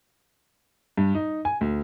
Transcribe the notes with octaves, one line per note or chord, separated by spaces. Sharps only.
G2
D#4
G#5
D2